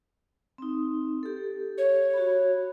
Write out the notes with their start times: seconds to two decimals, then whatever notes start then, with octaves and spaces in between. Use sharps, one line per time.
0.58 C4 D#4
1.23 G4 A4
1.78 C#5
2.14 F#4 B5